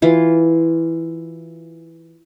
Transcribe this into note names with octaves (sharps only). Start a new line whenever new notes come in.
E3 F4